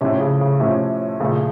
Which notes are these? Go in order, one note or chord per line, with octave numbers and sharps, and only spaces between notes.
A2 C3 F3 A3 C#4
C#3
C#3
A2 C3 F3 A3 C#4
A#1 A#2 C#3 A3